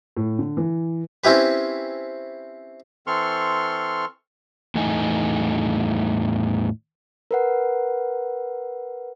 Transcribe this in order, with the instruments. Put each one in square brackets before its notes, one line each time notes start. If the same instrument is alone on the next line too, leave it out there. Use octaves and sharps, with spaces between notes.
[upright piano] A2
D3
E3
[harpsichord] C4 C#4 E4 G4 B4
[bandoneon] E3 C4 A4 C6 C#6 F6
[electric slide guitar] E2 A2 A3 D#4 G#5
[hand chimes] A#4 B4 F#5